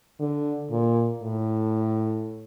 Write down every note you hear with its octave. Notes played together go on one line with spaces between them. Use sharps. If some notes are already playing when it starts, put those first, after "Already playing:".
D3
A#2
A2